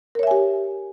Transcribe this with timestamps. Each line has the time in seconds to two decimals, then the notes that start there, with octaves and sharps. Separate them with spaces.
0.15 A#4
0.19 C#5
0.23 E5
0.27 G#5
0.31 G4